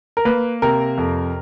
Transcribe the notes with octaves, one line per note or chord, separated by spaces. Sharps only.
A#4
A#3 B4
C3 A#4
F2